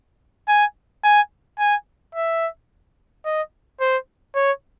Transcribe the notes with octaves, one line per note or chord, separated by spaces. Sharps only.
G#5
G#5
G#5
E5
D#5
C5
C#5